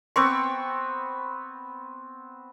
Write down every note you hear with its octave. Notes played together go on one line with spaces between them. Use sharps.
B3 C4 C#6